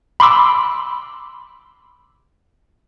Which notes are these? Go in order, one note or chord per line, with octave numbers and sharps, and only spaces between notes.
B5 C6 D6 E6